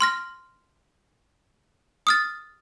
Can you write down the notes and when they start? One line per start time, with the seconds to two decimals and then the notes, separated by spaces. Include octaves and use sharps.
0.01 C6 F6 A#6
2.07 D#6 F6 A6